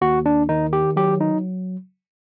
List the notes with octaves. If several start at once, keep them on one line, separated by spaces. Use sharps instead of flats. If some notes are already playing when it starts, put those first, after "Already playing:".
D#2 F#4
D4
D#3 D#4
G4
F#3 G4
D#4